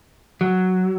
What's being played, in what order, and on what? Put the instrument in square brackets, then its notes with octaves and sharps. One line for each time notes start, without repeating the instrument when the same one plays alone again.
[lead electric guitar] F#3